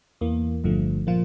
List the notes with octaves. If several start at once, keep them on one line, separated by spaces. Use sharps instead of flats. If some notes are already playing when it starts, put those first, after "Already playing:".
E2 E3 A#3
G1 G2 D3 F3 A3
A#2 F3 A#3 F4